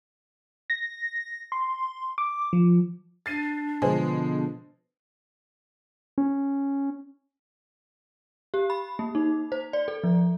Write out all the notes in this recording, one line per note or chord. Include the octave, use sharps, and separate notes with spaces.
A#6
C6
D6
F3
D4 A6 C7 D#7
B2 D3 F3 G#3 B4 C5 G#5
C#4
G4
B5
A#3
D#4
C5
D5
A4
F3